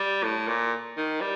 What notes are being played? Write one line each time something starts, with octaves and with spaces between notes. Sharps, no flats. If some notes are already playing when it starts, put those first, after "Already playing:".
Already playing: G3
A2
A#2
D#3
G3